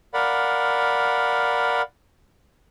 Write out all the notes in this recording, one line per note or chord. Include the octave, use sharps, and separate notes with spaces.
A#4 D5 F5 F#5 B5